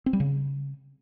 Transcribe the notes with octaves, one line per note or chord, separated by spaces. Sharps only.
C4
G3
C#3